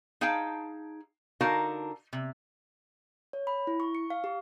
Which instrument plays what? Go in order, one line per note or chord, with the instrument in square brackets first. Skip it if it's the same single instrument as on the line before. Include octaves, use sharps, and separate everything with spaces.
[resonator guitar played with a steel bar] D#4 G#4 F5 G5 A5
D3 D#4 F#4 A#4 F5 A5
C3
[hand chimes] C#5
B5
E4
C#6
C#7
F5
G4